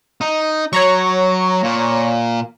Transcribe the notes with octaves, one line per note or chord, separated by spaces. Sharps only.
D#4
F#3 C#5 A#5 C#6
A#2